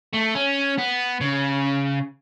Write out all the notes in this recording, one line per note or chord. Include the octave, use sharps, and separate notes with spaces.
A3
C#4
B3
C#3